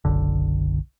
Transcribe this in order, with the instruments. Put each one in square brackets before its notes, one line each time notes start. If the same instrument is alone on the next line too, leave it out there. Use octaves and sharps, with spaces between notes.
[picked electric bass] F#1 B1 D3